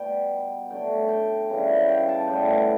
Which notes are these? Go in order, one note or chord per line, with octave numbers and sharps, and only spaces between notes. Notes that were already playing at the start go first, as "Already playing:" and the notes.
Already playing: B2 G3 B3 G5
D3 F#3 A3 G5
G5
C#3 E3 G3
G5
A5
A2 G3 B3 G5